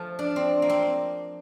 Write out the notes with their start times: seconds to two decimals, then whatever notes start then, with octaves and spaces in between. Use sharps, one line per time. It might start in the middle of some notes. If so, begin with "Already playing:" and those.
Already playing: F3 A3
0.19 D4
0.36 C4
0.62 A#3
0.69 C4